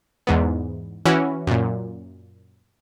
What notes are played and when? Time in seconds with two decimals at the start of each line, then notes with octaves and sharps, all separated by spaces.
0.27 E2 G#2 B3
1.06 E3 C#4 E4 F#4
1.47 F#2 A#2